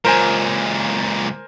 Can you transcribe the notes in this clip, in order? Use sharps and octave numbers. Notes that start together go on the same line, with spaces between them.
C#2 A#2 A#4 C5 G#5